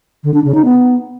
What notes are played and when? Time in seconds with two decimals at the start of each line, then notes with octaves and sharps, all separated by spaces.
0.24 D3
0.34 D4
0.44 C#3
0.54 D#4
0.65 B3